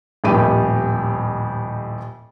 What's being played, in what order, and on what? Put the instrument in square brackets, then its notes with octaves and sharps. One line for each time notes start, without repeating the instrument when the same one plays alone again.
[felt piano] D#1 F2 A2 G4 D#7